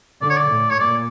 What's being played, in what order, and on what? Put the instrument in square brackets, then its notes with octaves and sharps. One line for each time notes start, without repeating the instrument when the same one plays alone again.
[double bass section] D3 [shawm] D5
[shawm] C#5
D5
[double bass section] A2
[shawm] C#5
[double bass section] A#2 [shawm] D5